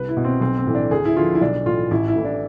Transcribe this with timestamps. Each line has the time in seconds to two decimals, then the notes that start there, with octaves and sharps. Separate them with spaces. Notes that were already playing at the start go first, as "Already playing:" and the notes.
Already playing: C2 B4
0.09 E4
0.17 B2
0.24 C4
0.41 B1 C4
0.58 C4
0.67 A2 E3
0.75 D4
0.91 D2 G#4
1.05 E4
1.17 D3 F3 F4
1.35 E4
1.41 B1 D4
1.66 A2 E3 F4
1.91 A1 E4
2.08 E4
2.16 A2 E3
2.25 D4